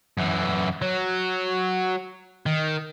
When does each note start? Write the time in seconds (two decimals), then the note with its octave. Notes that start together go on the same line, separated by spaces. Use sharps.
0.18 F#2 E3
0.82 F#3
2.46 D#3